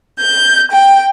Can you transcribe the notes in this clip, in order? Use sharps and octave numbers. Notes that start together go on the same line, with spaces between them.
G6
G5